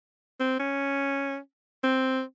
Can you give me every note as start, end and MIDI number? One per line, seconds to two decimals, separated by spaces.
0.40 0.55 60
0.60 1.38 61
1.83 2.21 60